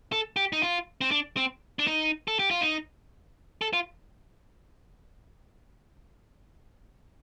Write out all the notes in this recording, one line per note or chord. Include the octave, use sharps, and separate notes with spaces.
A4
G4
D#4
F4
C4
D4
C4
D4
D#4
A4
G4
F4
D#4
A4
F4